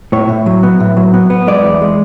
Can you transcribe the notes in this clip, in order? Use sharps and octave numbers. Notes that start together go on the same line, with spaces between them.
A2 C#5
A2
F#3
B3
A2
F#3
B3
B3
G#3 D5
E2
G#3